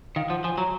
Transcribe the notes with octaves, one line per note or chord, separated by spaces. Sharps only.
D#3 F5
F3 F#5
F3 G#5
F#3 A#5